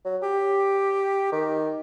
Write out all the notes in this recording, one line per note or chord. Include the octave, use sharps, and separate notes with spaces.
F#3
G4
D#3